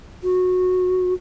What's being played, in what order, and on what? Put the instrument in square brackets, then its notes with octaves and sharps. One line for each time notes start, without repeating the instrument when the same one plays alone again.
[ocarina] F#4